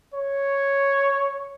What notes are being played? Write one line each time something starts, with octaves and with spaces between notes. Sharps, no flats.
C#5